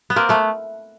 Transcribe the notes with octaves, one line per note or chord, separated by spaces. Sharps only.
B3
A#3 C4
A3 B3